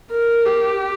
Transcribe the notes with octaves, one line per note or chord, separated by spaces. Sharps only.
A#4
G4